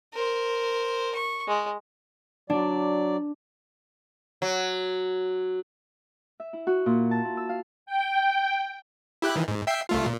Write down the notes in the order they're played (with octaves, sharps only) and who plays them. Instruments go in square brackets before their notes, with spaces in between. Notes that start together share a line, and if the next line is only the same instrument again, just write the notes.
[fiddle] A#4 C5
C#6
G#3
[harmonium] F#3 D5 [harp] D4
[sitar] F#3
[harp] E5
E4
F#4
A#2
A5
E4
E6
F5
[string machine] G5
[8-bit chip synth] E4 G4 F#6
D#3 E3
G#2
E5 G5 C7
C2 A3 F4
A#2